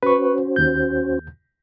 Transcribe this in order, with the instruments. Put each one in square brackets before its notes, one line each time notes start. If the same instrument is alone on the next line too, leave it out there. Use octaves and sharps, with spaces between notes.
[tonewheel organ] C#4 F#4 C5 [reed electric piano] B4 C#6
[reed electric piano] D#2 G6